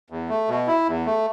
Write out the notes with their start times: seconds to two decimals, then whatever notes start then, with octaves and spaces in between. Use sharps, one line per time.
0.10 E2
0.29 A3
0.48 B2
0.67 E4
0.87 E2
1.06 A3